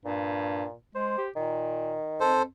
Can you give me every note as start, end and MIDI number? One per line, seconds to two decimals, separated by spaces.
0.05 0.65 43
0.05 0.73 46
0.95 1.17 56
0.95 1.24 72
1.18 1.30 67
1.36 1.93 46
1.36 2.36 51
2.20 2.45 41
2.20 2.43 69
2.20 2.43 72